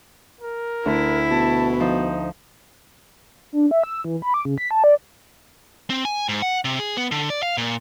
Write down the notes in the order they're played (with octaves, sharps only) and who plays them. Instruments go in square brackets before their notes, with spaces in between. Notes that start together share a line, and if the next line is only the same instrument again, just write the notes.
[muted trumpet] A#4
[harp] D2 [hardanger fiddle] E4
[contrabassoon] B2 [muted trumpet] A5
[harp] F3 [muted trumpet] D#4
[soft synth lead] D4
E5
E6
E3
B5
D6
C#3
B6
A5
D5
[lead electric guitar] C4
G#5
G#2
F#5
C3
G#4
B3
D3
D5
F5
A#2